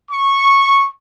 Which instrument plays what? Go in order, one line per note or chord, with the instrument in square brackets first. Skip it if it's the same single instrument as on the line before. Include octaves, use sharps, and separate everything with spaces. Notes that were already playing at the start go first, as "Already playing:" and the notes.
[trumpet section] C#6